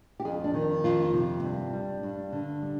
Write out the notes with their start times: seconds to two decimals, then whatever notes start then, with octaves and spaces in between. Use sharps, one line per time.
0.20 G4
0.25 F2 G#4
0.44 D4
0.54 D#3
0.84 F2 F4
1.13 C3
1.43 G2
1.73 G3
2.03 G2
2.32 D3
2.62 G3